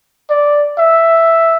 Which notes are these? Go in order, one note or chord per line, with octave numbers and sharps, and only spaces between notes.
D5
E5